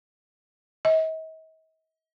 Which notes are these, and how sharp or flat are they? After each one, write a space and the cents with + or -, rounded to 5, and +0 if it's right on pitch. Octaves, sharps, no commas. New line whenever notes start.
D#5 +45